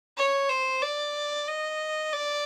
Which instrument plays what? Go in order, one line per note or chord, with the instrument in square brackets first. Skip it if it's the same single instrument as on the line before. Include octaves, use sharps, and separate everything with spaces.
[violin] C#5
C5
D5
D#5
D5